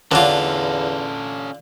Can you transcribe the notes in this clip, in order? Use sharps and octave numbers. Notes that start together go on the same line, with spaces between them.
E2 D3 F#3 C#4 D4 F4 A4